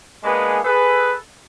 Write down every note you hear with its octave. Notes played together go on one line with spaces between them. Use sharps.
G#3 A#3 B3 D4 G#4 B4
G#4 A4 B4